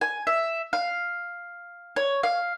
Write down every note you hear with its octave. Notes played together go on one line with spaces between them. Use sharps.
G#5
E5
F5
C#5
F5